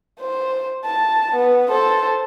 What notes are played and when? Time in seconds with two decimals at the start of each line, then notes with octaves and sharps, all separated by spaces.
0.20 C5
0.85 A5
1.35 B3
1.69 A4 C5